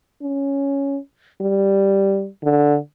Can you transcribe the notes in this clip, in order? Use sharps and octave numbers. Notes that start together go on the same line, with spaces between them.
C#4
G3
D3